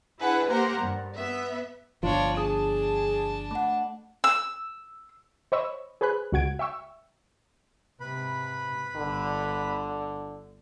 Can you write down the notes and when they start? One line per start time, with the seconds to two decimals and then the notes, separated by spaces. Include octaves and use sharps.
0.19 D4 E4 G#4 B4 F#5
0.48 A#3 G4 A#4 C5 F#5 A#5
0.81 G2
1.15 B3 E5
2.03 G1 F3 D4 F4 C5 C#5
2.37 D4 G#4 A5 D#6
3.51 A3 F#5
4.24 E6
5.52 C5 C#5 D#5 B5 C#6 E6
6.01 G#4 B4 C5 G#5 B5 F#6
6.32 C#2 F#4 F#5 G#6 D7
6.59 E5 G5 C#6 E6
8.00 G#2 C3 B4 B5
8.96 G1 D3